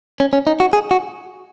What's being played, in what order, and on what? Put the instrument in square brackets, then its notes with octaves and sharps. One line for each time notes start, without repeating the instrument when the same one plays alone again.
[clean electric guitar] C#4
C#4
D#4
F#4
G#4
F#4